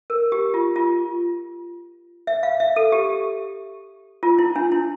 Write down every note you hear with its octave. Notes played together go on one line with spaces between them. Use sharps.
A#4
G4
F4
F4
E5
F5
E5
A4
G4
F4
E4
D4
E4